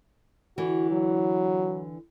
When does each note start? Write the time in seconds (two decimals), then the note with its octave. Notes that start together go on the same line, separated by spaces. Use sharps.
0.58 D3 E3 F#4
0.91 F#3